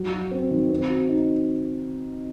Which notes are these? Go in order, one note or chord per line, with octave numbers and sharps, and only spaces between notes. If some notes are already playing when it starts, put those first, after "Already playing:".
Already playing: F#3
F#4
C4
D#3
C4
F#4
D#4